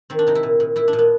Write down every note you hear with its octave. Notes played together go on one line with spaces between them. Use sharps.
D#3 C4
D4
C3 D#4
E4
A#2
A#2
A#2 E4
D4
A#2
B3